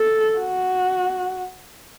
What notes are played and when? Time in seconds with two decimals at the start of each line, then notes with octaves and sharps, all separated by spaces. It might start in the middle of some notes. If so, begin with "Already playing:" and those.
Already playing: A4
0.39 F#4